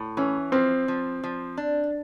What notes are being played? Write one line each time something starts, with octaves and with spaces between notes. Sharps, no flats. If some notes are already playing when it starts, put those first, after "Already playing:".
Already playing: A2
E3 C#4
F3 C4
F3
F3
D4